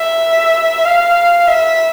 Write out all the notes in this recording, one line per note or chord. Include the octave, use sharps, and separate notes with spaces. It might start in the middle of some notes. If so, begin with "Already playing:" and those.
Already playing: E5
F5
E5